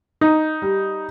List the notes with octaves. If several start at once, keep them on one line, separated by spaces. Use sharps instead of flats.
D#4
G3